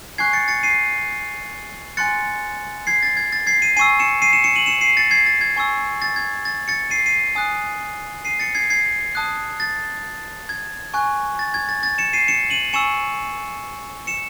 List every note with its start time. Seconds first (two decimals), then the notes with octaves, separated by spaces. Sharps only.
0.18 G#5 C#6 F#6 G#6 C7
0.33 A6 C#7
0.48 A6 C#7
0.63 C7 D#7
1.97 G#5 C6 F#6 A6 C#7
2.87 G#6 C7
3.03 A6
3.17 G#6
3.32 A6
3.47 G#6 C7
3.62 C7 D#7
3.76 G#5 C#6 E6 C7 D#7
3.99 C#7 E7
4.22 C7 D#7
4.33 C#7 E7
4.44 C#7 E7
4.55 D#7 F#7
4.66 C#7 E7
4.81 C7 D#7
4.97 A6 C#7
5.11 G#6 C7
5.26 A6
5.41 G#6
5.56 G#5 C#6 E6
6.02 A6
6.16 G#6
6.45 A6
6.68 A6 C#7
6.91 C7 D#7
7.06 C7 D#7
7.35 G#5 D#6 F#6
8.25 C7 D#7
8.39 A6 C#7
8.55 G#6 C7
8.70 G#6 C7
9.15 A5 D#6 F#6
9.60 A6
10.49 G#6
10.94 G#5 C#6 F#6
11.39 A6
11.54 G#6
11.69 A6
11.83 A6
11.98 C#7 E7
12.13 C7 D#7
12.28 C#7 E7
12.50 D#7 F#7
12.73 G#5 C#6 E6 C#7 E7
14.07 C#7 E7